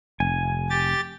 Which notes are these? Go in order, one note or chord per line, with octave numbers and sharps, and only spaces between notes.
F1 G#5
G4 A6